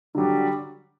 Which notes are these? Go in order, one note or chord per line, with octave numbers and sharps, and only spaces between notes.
D3 F#3 G3